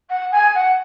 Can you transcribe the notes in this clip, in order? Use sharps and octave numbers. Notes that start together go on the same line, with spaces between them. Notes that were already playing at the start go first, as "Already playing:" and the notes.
F#5
G#5
F#5